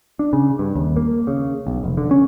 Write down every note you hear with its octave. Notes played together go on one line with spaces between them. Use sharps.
D4
C#3
G2
D#2
A#3
C#3
B1
F1
D3
C#4